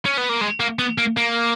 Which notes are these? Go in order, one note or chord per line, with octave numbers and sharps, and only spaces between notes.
C#4
B3
A#3
G#3
A#3
B3
A#3
A#3